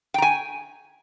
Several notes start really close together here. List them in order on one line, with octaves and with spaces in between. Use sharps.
G5 A#5 G#5